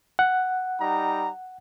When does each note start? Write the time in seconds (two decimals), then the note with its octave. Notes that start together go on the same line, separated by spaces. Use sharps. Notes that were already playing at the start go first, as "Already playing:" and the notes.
0.19 F#5
0.79 G3 D#4 A#5